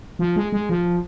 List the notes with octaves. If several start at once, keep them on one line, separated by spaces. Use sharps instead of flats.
F3
G#3
G#3
F3